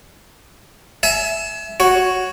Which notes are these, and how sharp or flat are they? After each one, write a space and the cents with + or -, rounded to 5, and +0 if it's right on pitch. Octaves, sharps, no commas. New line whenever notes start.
E5 +0 G#5 +35
F#4 +0 C#5 +0